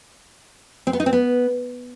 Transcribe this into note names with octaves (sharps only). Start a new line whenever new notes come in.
C4
B3
D#4
C4
B3